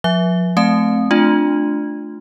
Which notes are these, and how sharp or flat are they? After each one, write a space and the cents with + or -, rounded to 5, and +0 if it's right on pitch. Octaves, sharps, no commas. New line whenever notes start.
F3 +35 E5 +0
A3 -20 C4 +0 A5 -30
A3 -5 D4 +10 F4 +0